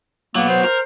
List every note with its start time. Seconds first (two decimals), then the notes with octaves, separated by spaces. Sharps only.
0.35 F#3 A#3 B3
0.49 C5
0.64 A#4